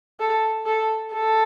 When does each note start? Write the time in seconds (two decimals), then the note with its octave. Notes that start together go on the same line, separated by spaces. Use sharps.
0.20 A4
0.66 A4
1.13 A4